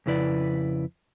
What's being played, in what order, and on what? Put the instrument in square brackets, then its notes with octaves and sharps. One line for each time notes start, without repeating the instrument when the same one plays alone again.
[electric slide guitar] F2 C#3 E4 B4 D5